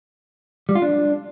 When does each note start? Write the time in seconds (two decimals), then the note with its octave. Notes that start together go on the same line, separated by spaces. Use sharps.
0.69 G3
0.75 F4
0.82 D4